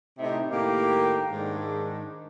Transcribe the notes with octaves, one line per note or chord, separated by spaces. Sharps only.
A2 C3 D#4
A2 D#3 A#3 G4
G#2 D#3 D4